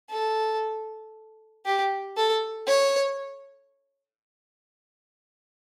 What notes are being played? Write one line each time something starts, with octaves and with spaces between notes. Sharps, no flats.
A4
G4
A4
C#5